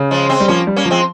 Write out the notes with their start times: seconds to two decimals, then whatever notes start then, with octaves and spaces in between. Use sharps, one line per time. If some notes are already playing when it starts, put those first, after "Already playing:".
Already playing: C#3
0.11 F3 G#3
0.29 G#3 C4
0.40 G3
0.48 F3 A#3 C#4
0.67 G3
0.76 A#3 C#4
0.85 F3
0.90 G#3 C4